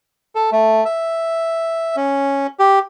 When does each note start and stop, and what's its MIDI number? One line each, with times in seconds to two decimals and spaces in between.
0.35 0.50 69
0.52 0.84 57
0.85 1.96 76
1.96 2.47 61
2.59 2.79 67